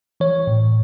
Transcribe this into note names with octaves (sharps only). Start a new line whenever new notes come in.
E3 C#5
A2